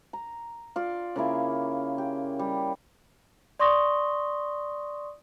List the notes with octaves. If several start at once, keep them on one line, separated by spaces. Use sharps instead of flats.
A#5
F4 D5
C#3 A#3 E4 A#4
G4
G3
D5 C6 C#6 D#6 A#6 G7